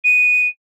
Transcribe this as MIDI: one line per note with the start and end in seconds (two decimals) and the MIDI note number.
0.04 0.48 99